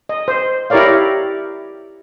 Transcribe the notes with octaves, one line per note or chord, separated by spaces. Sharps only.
D#5
C5
E4 G4 A#4 C#5 D5 F5